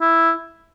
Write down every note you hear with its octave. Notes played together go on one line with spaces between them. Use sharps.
E4